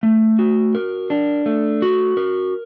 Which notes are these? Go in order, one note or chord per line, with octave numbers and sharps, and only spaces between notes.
A3
F#4
A#4
D4
A3
F#4
A#4